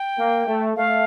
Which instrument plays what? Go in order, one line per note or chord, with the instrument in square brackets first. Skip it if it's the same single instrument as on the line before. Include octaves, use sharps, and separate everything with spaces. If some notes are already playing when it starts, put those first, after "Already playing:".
Already playing: [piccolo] G5
[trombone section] A#3
A3
[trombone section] A3 [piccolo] F5